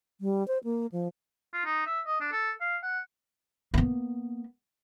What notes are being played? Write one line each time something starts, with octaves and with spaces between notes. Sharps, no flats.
G3
C5
A#3
F3
F4
D#4
E5
D#5
D4
A4
F5
F#5
A#3 B3